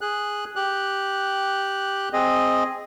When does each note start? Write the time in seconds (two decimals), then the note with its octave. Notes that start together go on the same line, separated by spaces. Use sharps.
0.01 G#4 F#6
0.56 G4 F#6
2.13 C4 G#4 D#5